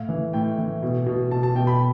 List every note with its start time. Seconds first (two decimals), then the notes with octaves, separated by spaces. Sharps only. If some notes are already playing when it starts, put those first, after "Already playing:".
Already playing: A2 F5
0.09 E3
0.33 A2 G5
0.58 E3
0.83 B2
1.06 B2
1.31 B2 A5
1.43 A5
1.55 B2 G5
1.67 B5